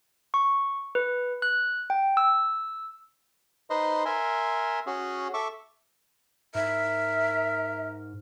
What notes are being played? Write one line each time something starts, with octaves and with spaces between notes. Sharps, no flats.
C#6
B4
F#6
G5
E6
D#4 B4 C5 D#5 C6
A#4 E5 G#5 C6
C#4 F#4 G#4
A4 E5 C#6 D6
G#2 A#4 E5